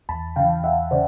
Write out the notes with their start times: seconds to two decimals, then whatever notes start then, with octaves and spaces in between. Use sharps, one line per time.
0.09 E2 A5 B5
0.36 C#3 E3 F5 G5
0.64 E2 E5 F#5
0.91 C#3 C5 D5